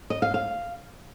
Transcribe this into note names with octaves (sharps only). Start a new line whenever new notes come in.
D#5
F5
F5